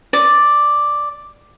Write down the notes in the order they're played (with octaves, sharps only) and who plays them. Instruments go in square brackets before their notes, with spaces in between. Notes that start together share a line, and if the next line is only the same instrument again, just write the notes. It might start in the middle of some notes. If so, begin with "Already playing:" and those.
[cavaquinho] D5